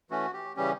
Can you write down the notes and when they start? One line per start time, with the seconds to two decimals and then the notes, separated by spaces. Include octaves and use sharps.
0.10 E3 A3 C#4 F#4
0.33 G4
0.56 C#3 E3 G3 C#4 G4